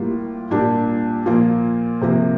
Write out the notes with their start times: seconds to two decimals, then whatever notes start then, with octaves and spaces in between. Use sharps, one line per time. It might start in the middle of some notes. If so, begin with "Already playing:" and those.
Already playing: A2 G3 A#3 F4
0.50 A#2 G3 A#3 D4 G4
1.26 A#2 F3 A#3 F4
2.02 C3 F3 A#3